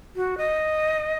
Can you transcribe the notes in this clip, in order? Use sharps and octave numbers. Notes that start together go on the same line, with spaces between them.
F#4
D#5